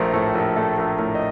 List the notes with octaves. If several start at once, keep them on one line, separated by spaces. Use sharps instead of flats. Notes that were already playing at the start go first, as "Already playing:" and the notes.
Already playing: A#1 A3 A#4 C5
A2 A4
A#1 A#4
A3 A4
A#1 A#4
A2 A#4
D#5